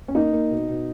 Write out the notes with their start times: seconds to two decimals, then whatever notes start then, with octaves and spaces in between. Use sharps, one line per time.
0.08 C#4
0.15 A#3 D#4
0.33 A#3
0.50 B2
0.69 B2